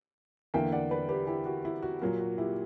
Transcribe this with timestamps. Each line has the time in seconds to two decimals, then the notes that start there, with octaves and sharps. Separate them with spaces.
0.54 E2 D3 A#3 E5 G5
0.72 D5 F#5
0.91 B4 D5
1.09 G4 B4
1.27 E4 G4
1.46 F#4
1.65 E4
1.83 F#4
2.02 A#2 F#3 A#3
2.19 F#4
2.38 E4 G4